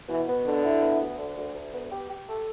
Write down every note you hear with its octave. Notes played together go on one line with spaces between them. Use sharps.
B2 E3
B3
B2 D3
E4
B3
D2
D3
D2
D2
B3
G4
G4
A4